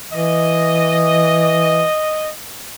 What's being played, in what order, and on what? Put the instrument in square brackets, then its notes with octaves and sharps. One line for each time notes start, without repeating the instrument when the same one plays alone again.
[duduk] E3 [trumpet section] D#5